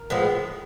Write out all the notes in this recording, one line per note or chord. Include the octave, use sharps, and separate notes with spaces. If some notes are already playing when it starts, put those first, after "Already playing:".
Already playing: A#4
A2 F3 G#3 B3